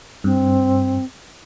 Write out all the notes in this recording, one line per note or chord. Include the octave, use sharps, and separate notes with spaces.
G2 C4